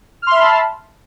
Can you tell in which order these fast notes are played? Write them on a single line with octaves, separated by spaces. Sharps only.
F6 C6 E5 B5 A5